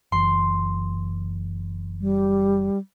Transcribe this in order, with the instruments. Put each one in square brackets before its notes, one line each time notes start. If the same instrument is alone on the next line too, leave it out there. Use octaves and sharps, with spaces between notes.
[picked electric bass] F#1 E3 [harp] C6
[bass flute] G3